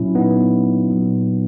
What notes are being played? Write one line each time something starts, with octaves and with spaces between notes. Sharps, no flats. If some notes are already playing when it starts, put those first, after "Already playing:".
Already playing: A#2 F#3 C#4 E4
B3 D#4
A#2 F#3